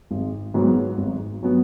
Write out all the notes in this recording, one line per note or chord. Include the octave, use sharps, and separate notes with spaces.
G#1
G#2 F#3 B3
G#1
F#3 B3